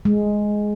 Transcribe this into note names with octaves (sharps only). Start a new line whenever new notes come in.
G#3